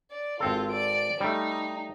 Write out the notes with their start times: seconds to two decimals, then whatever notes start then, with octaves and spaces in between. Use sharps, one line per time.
0.11 D5
0.40 G#1 C4 F4 A4
0.71 D5 D7
1.20 G3 A3 D#4